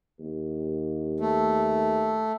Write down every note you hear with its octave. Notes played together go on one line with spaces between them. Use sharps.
D#2
A3